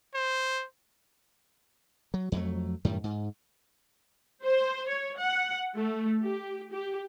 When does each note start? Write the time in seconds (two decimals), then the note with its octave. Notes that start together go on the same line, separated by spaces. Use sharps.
0.15 C5
2.14 F#3
2.32 F2 F#3 G#3 A3
2.85 F#2 A2 D#3 G3
3.04 G#2
4.44 C5
4.89 C#5
5.19 F#5
5.77 A3
6.24 G4
6.73 G4